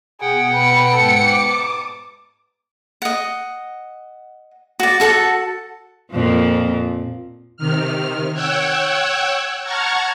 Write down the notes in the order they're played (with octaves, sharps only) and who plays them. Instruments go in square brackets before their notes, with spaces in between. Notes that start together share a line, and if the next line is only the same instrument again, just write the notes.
[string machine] B2 [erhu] G#4 [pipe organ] F#5 G5
[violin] B3 C#7 [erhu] B5
[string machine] G#2 C5 G#6 [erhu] A4
[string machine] A5 D#6 [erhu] D6
[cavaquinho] D#5 F#5
F#4 D5
F#4 A4 F#5 A5
[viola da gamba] F2 A#2 F3
[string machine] C3 D#3 F6
C#5 F#5 G5 E6 F#6 G#6
F#5 A5 A#5 C#6 F6 G#6